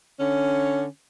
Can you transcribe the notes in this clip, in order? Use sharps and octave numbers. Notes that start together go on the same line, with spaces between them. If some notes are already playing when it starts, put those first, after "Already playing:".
D3 C#4